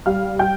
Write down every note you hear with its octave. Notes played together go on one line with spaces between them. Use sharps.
G3 F5 F6
G3 G5 G6